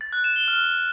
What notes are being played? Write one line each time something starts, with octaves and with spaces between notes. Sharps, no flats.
A6
F#6
E7
G7
F6